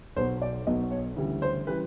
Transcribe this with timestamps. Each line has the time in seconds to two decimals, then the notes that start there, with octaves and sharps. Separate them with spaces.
0.16 B1 B2 F#3 B3 C5
0.42 D5
0.67 B1 B2 F#3 B3 D#5
0.91 C#5
1.16 D2 C#3 E3 G3
1.42 C5
1.67 C#3 E3 G3 B4